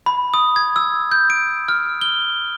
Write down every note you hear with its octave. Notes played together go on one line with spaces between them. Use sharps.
B5
D#6
G#6
E6
G6
D7
F6
G7